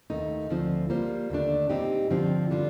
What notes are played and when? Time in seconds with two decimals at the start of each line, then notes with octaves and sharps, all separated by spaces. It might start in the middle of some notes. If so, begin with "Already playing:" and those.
0.10 D#2 D#3 A3 D#4
0.50 D2 D3 F3 C4
0.90 G3 A#3 F4 C5
1.30 D#2 D3 A3 D4
1.69 A#2 G3 C4 D#4 G4
2.10 G2 D3 F3 C4 F4
2.50 D3 G3 D4 F4